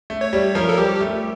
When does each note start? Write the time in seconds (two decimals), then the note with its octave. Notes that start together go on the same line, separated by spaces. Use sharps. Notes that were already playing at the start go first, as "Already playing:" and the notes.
0.10 A3
0.21 C#5
0.33 G3
0.55 F3 A#4
0.69 A4
0.78 G3 G4
1.01 A3